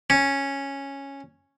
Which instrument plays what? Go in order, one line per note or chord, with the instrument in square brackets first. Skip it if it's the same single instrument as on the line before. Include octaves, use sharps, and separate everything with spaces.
[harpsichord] C#4